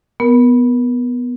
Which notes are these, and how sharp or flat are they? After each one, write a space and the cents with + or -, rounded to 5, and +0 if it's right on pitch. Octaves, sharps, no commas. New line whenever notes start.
B3 +0 A#4 +20